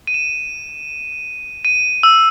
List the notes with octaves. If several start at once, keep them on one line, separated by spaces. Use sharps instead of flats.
D#7
E7
D#7
E6